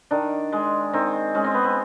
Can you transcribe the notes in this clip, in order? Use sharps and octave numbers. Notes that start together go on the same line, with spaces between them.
D#3 D4
G#3
D#3 C4
G#3 C#4
C4
B3
C4